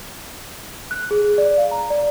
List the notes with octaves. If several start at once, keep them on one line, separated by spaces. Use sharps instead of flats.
F#6
G#4
D5
F5
A#5
D5